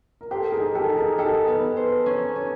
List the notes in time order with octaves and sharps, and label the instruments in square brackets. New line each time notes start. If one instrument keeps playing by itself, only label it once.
[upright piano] A#4
[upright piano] G4 A4 [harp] C5
[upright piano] G#4 A#4
[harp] D#4
[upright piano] G4 A4
[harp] D#4
[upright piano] G#4 A#4
[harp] D#4 [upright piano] G4 A4
[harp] B3
C5
C#4
C#4